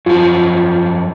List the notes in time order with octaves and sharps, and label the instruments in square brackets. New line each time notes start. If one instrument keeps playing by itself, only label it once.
[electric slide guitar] F#2 F3 [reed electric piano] F4